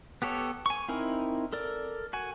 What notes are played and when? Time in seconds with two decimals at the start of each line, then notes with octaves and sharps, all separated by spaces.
0.22 B3 G4 A4 C#5
0.66 G#5 C#6
0.89 C4 D#4 E4 A#4
1.53 A4 A#4 D5
2.13 F#4 G#5